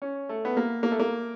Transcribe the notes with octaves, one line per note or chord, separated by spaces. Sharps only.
C#4
A3
B3
A#3
A#3
A3
A#3